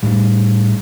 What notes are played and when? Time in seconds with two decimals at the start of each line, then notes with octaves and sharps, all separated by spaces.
0.03 A2 G3